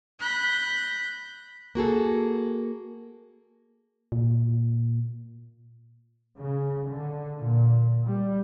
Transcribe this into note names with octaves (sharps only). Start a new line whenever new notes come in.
B5 F#6 G6 A#6
A#3 F#4 G#4 A4
A#2
C#3
D3
A#2
G3